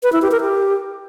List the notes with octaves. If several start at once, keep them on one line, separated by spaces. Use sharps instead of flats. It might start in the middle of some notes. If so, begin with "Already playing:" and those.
B4
E4
G4
A#4
G4